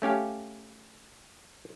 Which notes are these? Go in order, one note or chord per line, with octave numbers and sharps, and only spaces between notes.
A3 C#4 G4 F5